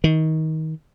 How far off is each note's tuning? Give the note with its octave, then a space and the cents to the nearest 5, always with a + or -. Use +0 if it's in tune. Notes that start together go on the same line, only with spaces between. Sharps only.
D#3 +25